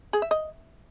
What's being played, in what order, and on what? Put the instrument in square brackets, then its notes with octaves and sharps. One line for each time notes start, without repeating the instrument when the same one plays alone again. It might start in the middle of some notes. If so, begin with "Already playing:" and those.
[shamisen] G#4
E5
D#5